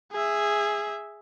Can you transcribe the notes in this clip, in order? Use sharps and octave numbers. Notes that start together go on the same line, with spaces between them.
G#4 E5